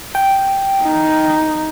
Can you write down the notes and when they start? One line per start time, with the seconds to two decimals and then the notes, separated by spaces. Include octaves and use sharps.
0.15 G5
0.82 D#4